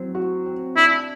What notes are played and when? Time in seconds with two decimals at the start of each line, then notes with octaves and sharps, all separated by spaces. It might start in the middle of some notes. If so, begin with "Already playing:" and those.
Already playing: F#3 C4 C5
0.15 F#4
0.46 C4
0.77 D4 E4